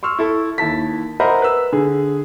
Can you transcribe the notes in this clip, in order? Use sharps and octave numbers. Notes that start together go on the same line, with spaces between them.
C6 C#6 E6 F6
E4 A4 C#6
D#2 E4 A5 B6
A#4 C5 D#5 E5 F#5 B5
B4 E6
D3 G#4